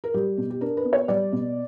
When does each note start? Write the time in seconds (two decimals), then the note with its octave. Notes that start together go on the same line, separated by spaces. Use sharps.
0.04 A#4
0.14 G3 G4
0.37 B2
0.50 G4
0.61 D4 A#4
0.77 B4
0.85 B3
0.93 C#5
1.08 G3 D5
1.32 B2